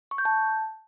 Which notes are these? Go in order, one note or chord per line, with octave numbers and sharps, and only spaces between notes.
C#6
G6
A5